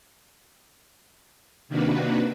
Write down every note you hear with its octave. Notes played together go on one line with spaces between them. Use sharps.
C3 D#3 A#3 D4 F#4 B4